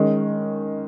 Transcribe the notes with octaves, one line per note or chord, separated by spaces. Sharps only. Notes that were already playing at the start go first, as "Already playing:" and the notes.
Already playing: D#3 G#3 C#4